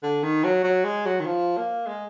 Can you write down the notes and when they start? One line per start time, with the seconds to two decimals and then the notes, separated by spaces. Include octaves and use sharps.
0.03 D3
0.23 D#3
0.44 F#3
0.64 F#3
0.84 G#3
1.06 F#3
1.20 D#3
1.26 F3
1.57 A#3
1.87 G#3